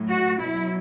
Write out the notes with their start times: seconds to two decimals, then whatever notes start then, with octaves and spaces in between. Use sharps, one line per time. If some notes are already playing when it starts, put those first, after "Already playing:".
Already playing: A2 F#3
0.09 F#4
0.40 B2 F#3 E4